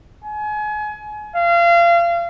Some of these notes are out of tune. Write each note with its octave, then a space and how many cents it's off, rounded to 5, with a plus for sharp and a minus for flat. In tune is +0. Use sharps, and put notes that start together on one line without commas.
G#5 +30
F5 -30